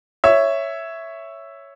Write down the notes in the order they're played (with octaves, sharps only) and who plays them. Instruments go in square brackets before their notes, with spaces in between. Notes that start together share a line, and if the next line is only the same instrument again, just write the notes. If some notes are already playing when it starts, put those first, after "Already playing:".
[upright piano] C#5 E5